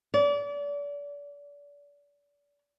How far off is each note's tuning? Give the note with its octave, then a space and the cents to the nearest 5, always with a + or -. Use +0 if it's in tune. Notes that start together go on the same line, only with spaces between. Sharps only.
D5 -35